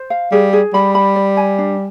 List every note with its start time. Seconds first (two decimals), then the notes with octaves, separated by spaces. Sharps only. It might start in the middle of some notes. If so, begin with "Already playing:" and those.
Already playing: C5
0.10 F5
0.31 G3 G#4
0.53 G#4
0.74 G3 B5
0.95 B5
1.15 D5
1.37 G#5
1.58 D4